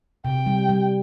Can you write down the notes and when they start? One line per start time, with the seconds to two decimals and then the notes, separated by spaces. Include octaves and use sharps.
0.25 C3 G5
0.46 G3
0.69 G3